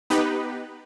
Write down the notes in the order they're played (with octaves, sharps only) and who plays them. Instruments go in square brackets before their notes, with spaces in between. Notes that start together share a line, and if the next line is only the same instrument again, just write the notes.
[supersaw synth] B3 D#4 G4 B4